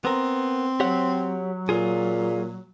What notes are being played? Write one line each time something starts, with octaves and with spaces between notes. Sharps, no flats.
B3 C4 A#4
F#3 G4 C#5 F#5
A#2 F4 G#4